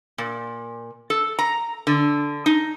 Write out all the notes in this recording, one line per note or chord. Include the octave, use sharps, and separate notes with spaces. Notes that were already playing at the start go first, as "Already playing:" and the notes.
A#2
A4
A#5
D3
D#4